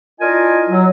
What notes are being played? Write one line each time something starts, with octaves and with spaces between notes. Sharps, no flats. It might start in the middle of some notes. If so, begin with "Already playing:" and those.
D4 E4 F4 A#4 D#5 G#5
F#3